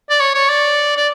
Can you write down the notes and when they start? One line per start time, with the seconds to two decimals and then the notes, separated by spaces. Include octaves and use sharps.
0.10 D5
0.20 C#5
0.35 C#5
0.49 D5
0.97 D5